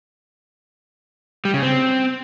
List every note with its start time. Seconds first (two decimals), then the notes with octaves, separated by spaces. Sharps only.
1.45 G3
1.54 C#3
1.63 C4